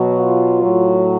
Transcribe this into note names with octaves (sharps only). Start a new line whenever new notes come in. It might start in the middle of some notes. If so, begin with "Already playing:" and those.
Already playing: B2 F#3
F4
A2 F#3